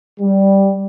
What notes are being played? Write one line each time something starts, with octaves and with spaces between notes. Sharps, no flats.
G3